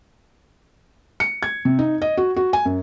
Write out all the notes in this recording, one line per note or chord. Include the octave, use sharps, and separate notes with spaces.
C#7
G#6
C3
D#4
D#5
F#4
F#4
G#5
F#2